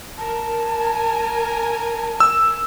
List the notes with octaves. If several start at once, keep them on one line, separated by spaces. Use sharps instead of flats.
A#4 A5
A#4 G#5
E6